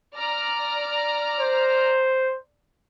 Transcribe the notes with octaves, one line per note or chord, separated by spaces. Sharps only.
D5 A#5 F6
C5